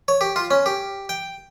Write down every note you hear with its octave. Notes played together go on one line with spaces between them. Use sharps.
C#5
G4
F4
C#4
G4
G5